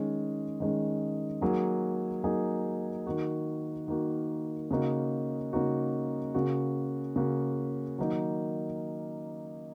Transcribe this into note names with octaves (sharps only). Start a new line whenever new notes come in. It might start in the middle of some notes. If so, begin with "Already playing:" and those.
Already playing: D#3 G#3 C#4
D#3 G#3 C#4
F#3 A#3 D#4 G#4
F#3 A#3 D#4 G#4
D#3 A#3 F#4
D#3 A#3 F#4
C#3 A#3 D#4 F#4
C#3 A#3 D#4 F#4
C#3 A#3 F#4
C#3 A#3 F#4
D#3 F#3 A#3 D#4